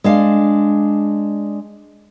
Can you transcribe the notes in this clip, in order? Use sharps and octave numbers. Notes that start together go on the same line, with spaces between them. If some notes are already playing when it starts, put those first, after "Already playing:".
G#3 D4 F5